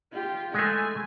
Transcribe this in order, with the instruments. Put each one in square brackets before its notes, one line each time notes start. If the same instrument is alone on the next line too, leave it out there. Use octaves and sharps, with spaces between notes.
[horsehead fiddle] F4 G4
[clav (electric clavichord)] G#3 A3 [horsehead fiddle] G#5